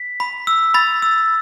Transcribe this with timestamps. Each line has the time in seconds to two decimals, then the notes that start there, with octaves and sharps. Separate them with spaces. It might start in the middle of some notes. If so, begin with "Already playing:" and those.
Already playing: B6
0.20 B5
0.47 E6
0.74 B5 A6
1.02 E6